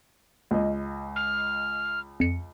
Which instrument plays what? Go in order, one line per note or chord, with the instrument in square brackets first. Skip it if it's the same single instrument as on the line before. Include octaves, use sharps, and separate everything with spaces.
[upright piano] C#2 D#5
[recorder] F6
[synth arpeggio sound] F2 C#7